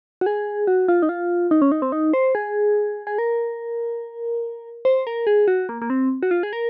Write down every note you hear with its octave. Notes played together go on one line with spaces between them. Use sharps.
F#4
G#4
F#4
F4
D#4
F4
D#4
C#4
D#4
C4
D#4
C5
G#4
G#4
A#4
C5
A#4
G#4
F#4
A#3
A#3
C4
F#4
F4
G#4
A#4